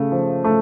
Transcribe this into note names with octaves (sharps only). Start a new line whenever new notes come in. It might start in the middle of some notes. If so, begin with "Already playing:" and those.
Already playing: C#3 A3
F3
A3